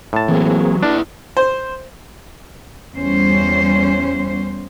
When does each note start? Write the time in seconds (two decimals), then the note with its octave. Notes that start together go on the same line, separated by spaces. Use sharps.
0.13 A2 A5
0.28 E3 F#3 A#3 C4 G#4
0.83 D4 E4 B4 D5
1.37 C5
2.96 E2 G3 C#4 C5